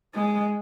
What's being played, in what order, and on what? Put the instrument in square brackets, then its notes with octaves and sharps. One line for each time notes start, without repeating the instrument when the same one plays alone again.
[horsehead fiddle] G#3